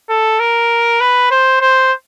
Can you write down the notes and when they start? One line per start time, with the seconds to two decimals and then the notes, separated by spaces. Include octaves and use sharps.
0.09 A4
0.40 A#4
1.01 B4
1.31 C5
1.61 C5